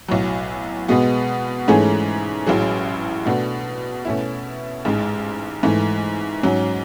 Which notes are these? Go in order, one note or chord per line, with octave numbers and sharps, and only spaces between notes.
B1 A2 F#3
B2 G#3 B3 F#4
G#2 E3 A3 C#4 G#4
A1 A2 F#3 C#4 G#4
B2 A3 D4 F#4
B2 A3 C#4 E4
A1 G#2 G#3
G#2 E3 A3
G#2 F#3 C#4